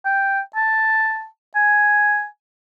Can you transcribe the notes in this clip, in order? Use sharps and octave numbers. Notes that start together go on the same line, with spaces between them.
G5
A5
G#5